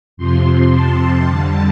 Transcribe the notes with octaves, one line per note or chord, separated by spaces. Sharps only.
F2 C3 F3 C6
A5
F2 D3 G3